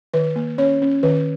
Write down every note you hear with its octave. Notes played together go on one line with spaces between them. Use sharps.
D#3 B4
A#3
C#4 C#5
C#4
D#3 B4